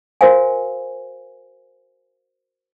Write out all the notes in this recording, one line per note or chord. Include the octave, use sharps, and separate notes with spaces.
F#4 A#4 C5 F5 G#5